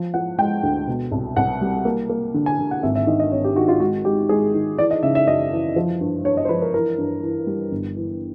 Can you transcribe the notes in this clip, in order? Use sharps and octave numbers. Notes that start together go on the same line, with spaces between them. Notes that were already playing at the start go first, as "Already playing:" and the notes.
Already playing: F3
F3 F#5
G#3 G5
D2
B2
C2
C2 F#5
G3
A#3
A#3
D3
G#5
D3
F#5
G#1 E5
E5
D#3 D#5
D#5
G#1 C#5
G4
D#3 F#4
F4
G#3 F#4
G#3 G4
G#3 G#4
D#3
E3 D5
D#5
C#3 E5
E5
F#2 D#5
E3
F3
G2
G2 C#5
D#5
C5
F3 B4
A#4
E3 A#4
G2
E3
G3
G1
E3